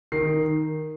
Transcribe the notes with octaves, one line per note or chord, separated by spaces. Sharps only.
D#3 C7